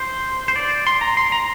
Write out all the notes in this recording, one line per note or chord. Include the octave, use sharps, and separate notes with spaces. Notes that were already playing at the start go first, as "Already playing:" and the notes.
Already playing: C5
C5
D5
C6
A#5
C6
A#5